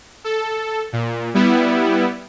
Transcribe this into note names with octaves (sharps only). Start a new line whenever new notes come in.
A4
A#2
G3 B3 E4